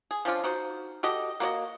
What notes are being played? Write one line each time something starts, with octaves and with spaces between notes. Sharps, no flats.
G#4
F3 C#4 D4 F4
D#4 F#4 C5
F#4 G4 A4 D#5
A#3 F#4 D5 D#5